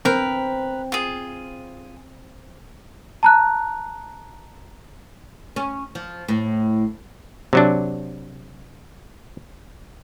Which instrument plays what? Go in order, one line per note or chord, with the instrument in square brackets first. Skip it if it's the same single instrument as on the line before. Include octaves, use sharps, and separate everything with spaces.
[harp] C4 [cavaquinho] A#4 B4
[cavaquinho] F4 G#4
[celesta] A5 A#5 F#6
[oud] C#4
F3
A2
[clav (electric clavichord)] C3 F#3 D4